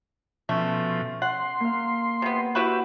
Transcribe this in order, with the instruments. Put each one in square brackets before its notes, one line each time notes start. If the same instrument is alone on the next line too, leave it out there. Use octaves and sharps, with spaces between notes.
[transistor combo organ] B2 F3 [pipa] A3 [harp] C#4
[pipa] F#5 [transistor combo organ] C6
[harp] A#3 F5
[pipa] C3 B3
[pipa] E4 F#4 B4 [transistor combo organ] G4 E5